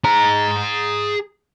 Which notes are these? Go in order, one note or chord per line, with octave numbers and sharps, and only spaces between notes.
G#4 A#5